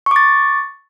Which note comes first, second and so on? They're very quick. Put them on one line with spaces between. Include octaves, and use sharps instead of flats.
C#6 D6 A6